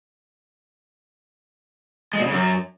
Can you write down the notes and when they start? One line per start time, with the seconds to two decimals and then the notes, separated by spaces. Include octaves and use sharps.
2.13 G#3
2.19 A#2
2.25 C#3
2.31 F#2